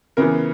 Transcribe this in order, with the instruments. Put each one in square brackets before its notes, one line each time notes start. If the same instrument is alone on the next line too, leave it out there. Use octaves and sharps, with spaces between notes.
[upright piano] C#3 E3 B3 A#4